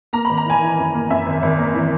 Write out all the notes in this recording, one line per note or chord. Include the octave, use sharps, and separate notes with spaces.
A#3 A#5
B5
G#1
A#5
E3 G#5
E3
F#2
A#3
F#2 E5
G#1
G#1
A#3
E3